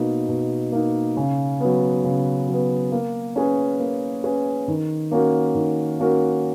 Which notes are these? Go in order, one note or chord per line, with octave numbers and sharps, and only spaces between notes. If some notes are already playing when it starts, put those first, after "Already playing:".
Already playing: B2 A#3 D#4
B2
A#3 D#4
C#3
F#3 B3
C#3
F#3 B3
A#3
C#4 G#4 B4
A#3
C#4 G#4 B4
D#3
A#3 C#4 F#4 A#4
D#3
A#3 C#4 F#4 A#4